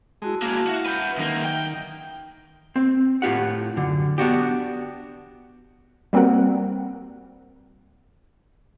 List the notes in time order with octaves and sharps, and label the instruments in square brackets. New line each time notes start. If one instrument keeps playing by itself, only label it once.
[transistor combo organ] G#3 [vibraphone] E4 F#4 A5
[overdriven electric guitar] A#3 G#4 [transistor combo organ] F5
[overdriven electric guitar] F#4 [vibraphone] E5 F#5
[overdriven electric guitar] B4 G5
[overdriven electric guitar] F#2 A#3 [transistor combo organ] D#3
[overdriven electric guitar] G5
[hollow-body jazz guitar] C4
A2 F4 G4 F#5
F#2 D3
B3 D4 F#4 G4
[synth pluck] G3 A#3 C4 F#4 A#4 F#5